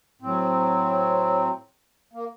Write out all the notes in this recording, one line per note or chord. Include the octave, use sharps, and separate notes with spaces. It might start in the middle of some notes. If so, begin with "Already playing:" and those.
A2 F#3 C4
A#3